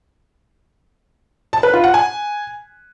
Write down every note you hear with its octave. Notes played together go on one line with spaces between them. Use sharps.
A5
B4
F4
F#5
G#5